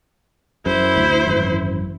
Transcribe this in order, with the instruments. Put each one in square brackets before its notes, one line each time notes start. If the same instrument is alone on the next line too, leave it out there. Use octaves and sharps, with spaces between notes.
[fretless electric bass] F#2 [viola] E4 C5
[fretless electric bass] D2
G#1 F#2 E3